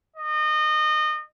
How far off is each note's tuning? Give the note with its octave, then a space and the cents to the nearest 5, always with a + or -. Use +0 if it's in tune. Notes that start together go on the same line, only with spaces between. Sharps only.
D#5 -25